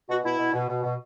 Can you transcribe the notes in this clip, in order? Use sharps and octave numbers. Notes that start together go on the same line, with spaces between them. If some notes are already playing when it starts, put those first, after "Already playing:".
B2 F#4
B2 E4
B2
B2
B2
B2